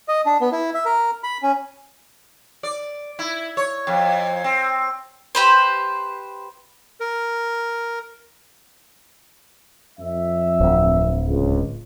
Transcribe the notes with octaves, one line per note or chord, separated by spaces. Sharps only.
D#5
D4
B3
E4
E5
A#4
B5
C#4
D5
E4
C#5
F2
C4
G4 B4 C5
A#4
F2 E5
D1
C#2